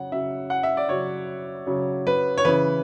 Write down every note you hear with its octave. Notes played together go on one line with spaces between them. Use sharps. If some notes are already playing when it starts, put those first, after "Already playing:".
Already playing: C#3 F#3 F#5
C#3 F#3 E5
F#5
E5
D5
C#3 F#3 C#5
C#3 F#3
B4
C#5
C#3 E3 B4